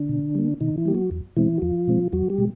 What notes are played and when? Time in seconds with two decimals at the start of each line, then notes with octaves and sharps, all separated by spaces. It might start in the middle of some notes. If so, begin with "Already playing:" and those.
Already playing: D3 D4
0.09 B2
0.35 G3 A#3
0.60 B2 D#3 D#4
0.77 E3 E4
0.86 G3 A#3 G4
0.94 F#3 F#4
1.11 E2
1.37 B2 E3 G#3 C4 E4
1.58 F#4
1.62 E2 F3 F4
1.88 B2 G#3 C4
2.13 E2 F#3 F#4
2.30 G3 G4
2.38 B2 G#3